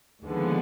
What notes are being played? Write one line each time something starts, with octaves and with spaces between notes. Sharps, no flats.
D#2 D3 F3 G#3 B3